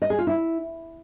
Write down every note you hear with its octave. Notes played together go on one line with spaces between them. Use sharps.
D#5
G#4
F4
E4